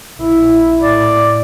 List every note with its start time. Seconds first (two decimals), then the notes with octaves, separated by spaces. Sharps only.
0.19 A#1 E4
0.83 A2 D5